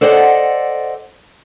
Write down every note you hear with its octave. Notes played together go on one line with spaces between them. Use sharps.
A4 C5 D5 D#5 F#5